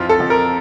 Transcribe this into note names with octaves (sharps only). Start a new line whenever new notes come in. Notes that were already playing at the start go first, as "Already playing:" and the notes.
Already playing: F2 E3 F4
A4
F2
A#4